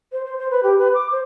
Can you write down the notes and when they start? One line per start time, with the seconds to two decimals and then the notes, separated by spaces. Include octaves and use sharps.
0.12 C5
0.25 C5
0.38 C5
0.51 B4
0.63 G4
0.78 B4
0.94 D6
1.12 C5